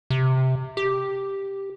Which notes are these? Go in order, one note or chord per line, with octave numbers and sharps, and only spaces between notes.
C3
G4